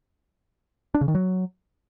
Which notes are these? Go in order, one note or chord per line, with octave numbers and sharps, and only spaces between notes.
D4
C#3
D#3
F#3